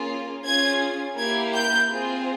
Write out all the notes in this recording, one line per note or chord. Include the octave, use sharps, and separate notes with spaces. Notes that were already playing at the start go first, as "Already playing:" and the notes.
Already playing: A#3 C#4 F4 G#4
C#4 F4 G#4 G#6
A#3 E4 G4 G#6
G6
C4 F4 G#4